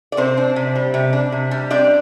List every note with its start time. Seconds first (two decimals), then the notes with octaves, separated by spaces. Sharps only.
0.12 D5
0.17 C3 C4 C5
0.37 D4
0.56 C3
0.76 G3
0.94 C3
1.13 D4
1.32 C3
1.51 G3
1.70 C4 D4 D5